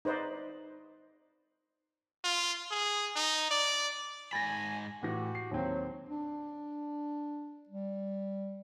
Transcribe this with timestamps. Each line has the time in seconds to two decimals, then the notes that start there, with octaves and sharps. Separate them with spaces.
0.05 D#4 B4 C5 D5 D#5
2.24 F4
2.71 G#4
3.16 D#4
3.51 D5
4.33 G#2 G#5 B5 A6 A#6
5.03 A2 E3 F#4 G4 A#6
5.35 C7
5.51 D#2 F#3 C4
6.09 D4
7.69 G3